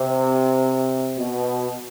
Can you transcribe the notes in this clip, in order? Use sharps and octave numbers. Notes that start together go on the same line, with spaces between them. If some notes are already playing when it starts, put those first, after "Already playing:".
Already playing: C3
B2